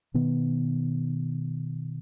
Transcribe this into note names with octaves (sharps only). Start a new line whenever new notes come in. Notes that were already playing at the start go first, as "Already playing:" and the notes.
B2 D#3 B3